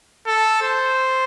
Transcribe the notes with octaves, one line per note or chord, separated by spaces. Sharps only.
A4
C5